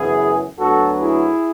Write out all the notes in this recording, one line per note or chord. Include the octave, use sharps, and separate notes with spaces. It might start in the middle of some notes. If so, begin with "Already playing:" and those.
Already playing: F#2 C#3 E3 B3 E4 G#4
D2 D3 F#3 B3 F#4 A4
E4 G#4